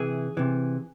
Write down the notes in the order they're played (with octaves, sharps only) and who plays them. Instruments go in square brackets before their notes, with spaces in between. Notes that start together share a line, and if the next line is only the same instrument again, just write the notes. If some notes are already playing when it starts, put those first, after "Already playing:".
Already playing: [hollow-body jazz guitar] C3 E3 G#4
C3 E3